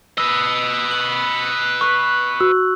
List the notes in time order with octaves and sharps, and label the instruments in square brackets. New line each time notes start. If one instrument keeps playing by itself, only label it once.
[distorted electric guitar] B4 D#5 [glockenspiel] E6
[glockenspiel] F#7
C#6 F#6
[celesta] F#4 [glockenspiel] E6